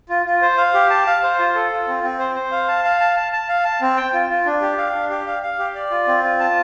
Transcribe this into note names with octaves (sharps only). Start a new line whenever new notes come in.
F4
F4
C5
F5
G4
A5
F5
C5
F4
A4
F4
C4
C4
C5
C5
F5
A5
F5
A5
A5
A5
F5
A5
C4
G5
F4
F4
D4
G4
F5
D4
G4
F5
F5
G4
D5
F4
C4
F4
A5